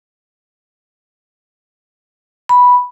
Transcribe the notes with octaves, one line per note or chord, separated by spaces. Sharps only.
B5